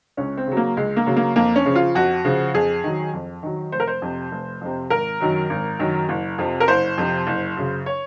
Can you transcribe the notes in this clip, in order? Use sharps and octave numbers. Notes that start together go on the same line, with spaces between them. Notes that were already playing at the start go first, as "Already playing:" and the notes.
C#2 C#4
C4
C#3 F#3
A#3
C#2 G#3
A#3
C#3 F#3
A#3
F2 A#3
C#4
C#3 F3
F4
F2 F#4
C#3 F3
F2 G#4
D#3 F#3
F2
D#3 F#3
F1 C5
A#4
C5
F2 C3
F1
F2 C3
G#1 A#4
F#2 D#3 F#3
G#1
F#2 D#3 F#3
F#1
F2 C3 F3
A#4
F#1 C5
F2 C3 F3
F#1
F#2 C#3
C#5